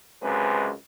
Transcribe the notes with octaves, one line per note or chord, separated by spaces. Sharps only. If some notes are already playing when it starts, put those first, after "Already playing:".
C#2 F#2 C3 G#3 B4